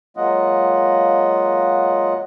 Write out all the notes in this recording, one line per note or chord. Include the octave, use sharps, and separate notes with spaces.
F#3 G#3 A#3 F4 D#5 F#5